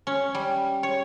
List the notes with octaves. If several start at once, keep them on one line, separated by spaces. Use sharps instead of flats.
C#4
G3
C#5